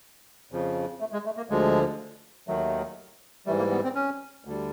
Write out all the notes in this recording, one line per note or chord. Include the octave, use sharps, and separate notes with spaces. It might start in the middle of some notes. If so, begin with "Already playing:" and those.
F2 C#3 F3
A3
G#3
A3
A#3
D2 D3 F3 G#3
D#2 D#3 F#3 A3
G#2 E3 G3 A3
A#3
B3
C4
C#4
D2 D3 G3